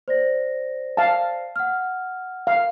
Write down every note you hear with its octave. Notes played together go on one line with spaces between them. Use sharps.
C5 D5 A#6
F5 A5
F#5 F6
F5